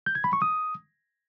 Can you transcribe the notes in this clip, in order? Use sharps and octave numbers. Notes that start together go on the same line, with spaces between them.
G6
G#6
B5
C#6
D#6